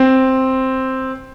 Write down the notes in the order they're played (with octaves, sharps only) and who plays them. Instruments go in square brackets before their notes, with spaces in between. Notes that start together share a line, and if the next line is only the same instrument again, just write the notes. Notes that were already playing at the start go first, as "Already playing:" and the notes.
Already playing: [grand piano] C4